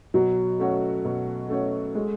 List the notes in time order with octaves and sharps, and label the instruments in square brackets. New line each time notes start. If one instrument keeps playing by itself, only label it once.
[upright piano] B2 [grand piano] F#3
[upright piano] A3 C#4 F#4 C#5
B2
A3 C#4 F#4 C#5
[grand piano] G#3 [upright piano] A3